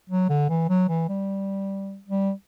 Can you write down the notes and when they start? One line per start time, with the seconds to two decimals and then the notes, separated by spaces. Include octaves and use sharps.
0.10 F#3
0.29 D3
0.50 E3
0.69 F#3
0.89 E3
1.09 G3
2.08 G3